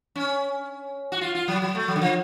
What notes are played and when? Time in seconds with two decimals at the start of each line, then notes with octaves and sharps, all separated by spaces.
0.16 C#4
1.12 F#4
1.21 F4
1.35 F4
1.48 F#3
1.62 F#3
1.75 A3
1.88 F#3
1.96 D3
2.01 F3